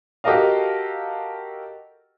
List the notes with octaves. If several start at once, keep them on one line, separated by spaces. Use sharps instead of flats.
F#4 G4 A4 A#4 D#5 F5